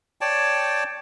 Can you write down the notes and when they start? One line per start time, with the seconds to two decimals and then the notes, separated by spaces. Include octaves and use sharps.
0.21 C#5 D5 G5 A5